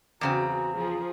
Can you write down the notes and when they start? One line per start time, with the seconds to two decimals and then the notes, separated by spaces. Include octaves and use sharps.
0.21 E2 C#3 C4 F#4 A#5
0.76 F3 G#4